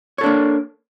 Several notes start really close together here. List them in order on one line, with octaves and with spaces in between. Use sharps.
C#5 A4 D4 A#3